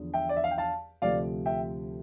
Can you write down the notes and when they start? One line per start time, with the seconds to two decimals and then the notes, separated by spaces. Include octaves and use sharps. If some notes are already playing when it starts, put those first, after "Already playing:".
Already playing: E2 D3 F3
0.14 E5 G5
0.29 D5
0.37 E5
0.44 F5
0.51 G5
0.58 F5 A5
1.02 D2 C3 F3 D5 F5
1.46 E5 G5